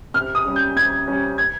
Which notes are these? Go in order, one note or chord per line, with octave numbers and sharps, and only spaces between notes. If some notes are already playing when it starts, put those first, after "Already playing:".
C3 F6
D#6
G3 C#4
G6
C3 G#6
G3 C#4
G#6